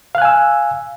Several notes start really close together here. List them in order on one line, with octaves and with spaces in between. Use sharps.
F5 F#6 G#5 E6